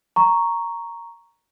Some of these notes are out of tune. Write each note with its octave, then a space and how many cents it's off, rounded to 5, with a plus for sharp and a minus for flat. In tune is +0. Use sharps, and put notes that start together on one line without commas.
A#5 +0 C#6 +0